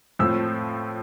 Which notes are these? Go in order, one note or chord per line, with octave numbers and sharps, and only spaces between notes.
A2 F3 A3 C4 E6